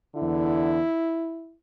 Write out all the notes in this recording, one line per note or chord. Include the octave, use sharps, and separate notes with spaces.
E2 D3 E4